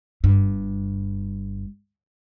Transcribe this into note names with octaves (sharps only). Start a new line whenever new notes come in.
G1 G2